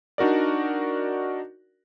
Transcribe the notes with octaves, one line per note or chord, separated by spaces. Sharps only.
D4 D#4 F#4 A#4 D5